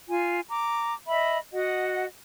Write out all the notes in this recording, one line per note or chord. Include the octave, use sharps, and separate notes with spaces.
F4 G#5
A#5 D6
D#5 E5 B5
F#4 D#5 F#5